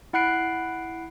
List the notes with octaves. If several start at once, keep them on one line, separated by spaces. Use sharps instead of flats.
E4 F#5 B5 F#6 C7 D7